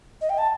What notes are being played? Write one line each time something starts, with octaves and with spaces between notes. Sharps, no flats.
D#5
G5
A5